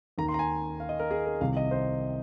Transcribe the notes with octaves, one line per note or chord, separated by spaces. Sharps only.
D#2 D#3 A#5
C6
A#5
G#5
F5
D#5
A#4
G#4
A#4
C2 C3 D#3 F5
D#5
C5